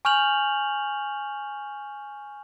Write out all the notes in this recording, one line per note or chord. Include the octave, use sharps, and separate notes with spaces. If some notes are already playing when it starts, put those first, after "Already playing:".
G#5 C#6 F6 G6 F7 F#7